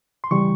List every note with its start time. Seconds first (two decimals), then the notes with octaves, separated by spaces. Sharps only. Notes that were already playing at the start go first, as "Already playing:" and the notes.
0.24 C6
0.31 C#3 E3 G3 C#6